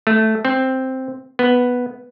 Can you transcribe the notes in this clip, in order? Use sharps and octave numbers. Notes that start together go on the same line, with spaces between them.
A3
C4
B3